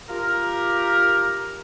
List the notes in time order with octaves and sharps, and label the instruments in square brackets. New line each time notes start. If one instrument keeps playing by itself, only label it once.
[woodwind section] F4 G4 A#4